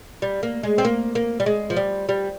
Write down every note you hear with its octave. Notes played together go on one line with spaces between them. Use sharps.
G3
A#3
G#3
C4
A#3
A#3
G3
G#3
F3
G3
G3